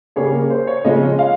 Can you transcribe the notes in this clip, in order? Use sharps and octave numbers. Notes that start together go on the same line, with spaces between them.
C#3 G3 A#3 C#4 G#4 C#5
A#4
C5
C#5
C#3 F3 G#3 C#4 D#5
F5